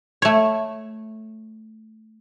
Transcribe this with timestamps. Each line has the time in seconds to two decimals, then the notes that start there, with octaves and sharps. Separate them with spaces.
0.22 A3 C#5